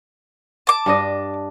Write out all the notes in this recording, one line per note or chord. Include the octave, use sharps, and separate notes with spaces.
A5 D6
G2 D4 D#5